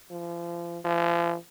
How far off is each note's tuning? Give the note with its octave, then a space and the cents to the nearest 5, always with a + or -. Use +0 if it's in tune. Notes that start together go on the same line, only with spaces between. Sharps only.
F3 -35
F3 -40